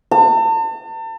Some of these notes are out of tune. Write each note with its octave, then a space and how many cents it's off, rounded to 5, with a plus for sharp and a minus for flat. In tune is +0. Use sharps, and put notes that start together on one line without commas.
A5 +40